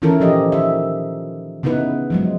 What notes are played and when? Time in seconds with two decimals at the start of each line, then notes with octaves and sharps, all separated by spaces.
0.02 D#3 E3 C#4 E4 A4 A#4
0.20 A#2 F3 G4 D#5
0.52 D#3 E5
1.63 C#3 B3 D#4 E4 B4
2.10 F3 F#3 G#3